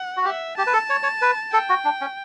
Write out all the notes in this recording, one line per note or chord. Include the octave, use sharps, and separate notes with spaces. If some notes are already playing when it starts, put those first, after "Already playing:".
Already playing: F#5
F#4
G4 E5
G4 A5
B4
A4
C#5
C#5
B4
A4 G5
F#4
D4
C#4